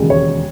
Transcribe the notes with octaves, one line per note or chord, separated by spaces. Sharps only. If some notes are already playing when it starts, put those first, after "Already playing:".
Already playing: E1 D#2 C#3 G#3
C#5